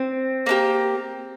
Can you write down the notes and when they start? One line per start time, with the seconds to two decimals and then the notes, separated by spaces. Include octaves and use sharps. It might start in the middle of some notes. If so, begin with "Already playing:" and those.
Already playing: C4
0.46 A#3 D4 G4